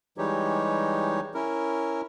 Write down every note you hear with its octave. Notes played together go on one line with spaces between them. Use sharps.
E3 G3 G#3 D#4 G4 C#5
C#4 E4 A#4